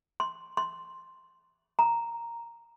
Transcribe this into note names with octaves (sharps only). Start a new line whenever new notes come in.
C6
C6
A#5